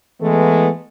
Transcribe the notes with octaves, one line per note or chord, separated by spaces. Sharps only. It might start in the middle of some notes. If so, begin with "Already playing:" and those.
E3 G#3 A3 B3